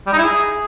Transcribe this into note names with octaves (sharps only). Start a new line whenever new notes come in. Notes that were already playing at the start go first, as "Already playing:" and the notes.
G3
D#4
E4
G#4